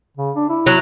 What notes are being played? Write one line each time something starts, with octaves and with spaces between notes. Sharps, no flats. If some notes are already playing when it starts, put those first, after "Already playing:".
C#3
D4
E4
F#3